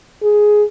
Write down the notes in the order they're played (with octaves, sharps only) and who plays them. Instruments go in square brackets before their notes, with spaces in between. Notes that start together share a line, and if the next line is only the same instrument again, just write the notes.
[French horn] G#4